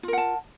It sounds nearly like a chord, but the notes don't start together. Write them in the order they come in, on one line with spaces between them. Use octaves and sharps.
F4 A#4 F#5 A5